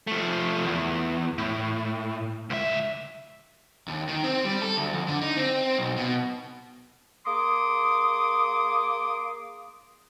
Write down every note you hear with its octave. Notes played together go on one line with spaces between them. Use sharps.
F3 A3
E2
A2
C#2 E5
D#2
D#3
C4
G3
A4
D2
F2
D3
D#4
C4
B1
B2
A#3 G#4 C6 D6 D#6